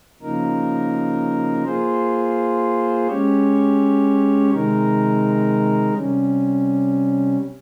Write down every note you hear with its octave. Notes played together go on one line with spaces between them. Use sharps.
C#3 F3 A#3 D#4 A#4
A#3 F4 G#4 C5
G#3 C#4 G4 C#5
C3 D#3 G#3 D#4 A#4
C3 G3 C#4